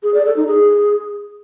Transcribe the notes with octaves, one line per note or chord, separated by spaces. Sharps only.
G#4
D5
A4
D#4
G#4